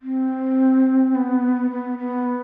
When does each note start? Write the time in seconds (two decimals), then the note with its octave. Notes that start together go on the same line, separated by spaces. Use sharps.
0.02 C4
1.15 B3
1.71 B3
1.99 B3